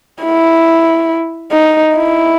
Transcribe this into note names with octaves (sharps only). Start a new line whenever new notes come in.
E4
D#4
E4